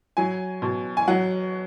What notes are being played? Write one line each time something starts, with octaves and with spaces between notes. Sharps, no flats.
F#3 G#5
B2
G#5
F#3 F#5